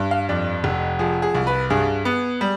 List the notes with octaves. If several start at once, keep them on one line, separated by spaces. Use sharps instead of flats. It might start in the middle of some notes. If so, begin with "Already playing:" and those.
Already playing: G2
F5
F2 D5
F1
F3 G#4
G#4
C2
B4
G2 G#4
B3
G3